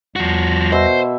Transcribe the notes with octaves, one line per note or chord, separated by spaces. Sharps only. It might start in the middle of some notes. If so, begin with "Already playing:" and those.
E2 F3 G3 F#4 A#6
B2 C5 E5